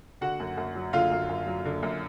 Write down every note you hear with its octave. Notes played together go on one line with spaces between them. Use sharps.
D3 F#4 F#5
F#2
F#2
F#3
D3 F4 F5
F#2
F#2
F#3
D3
F#2